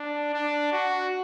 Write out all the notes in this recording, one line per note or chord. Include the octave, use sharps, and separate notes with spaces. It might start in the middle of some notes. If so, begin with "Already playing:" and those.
Already playing: D4
D4
F#4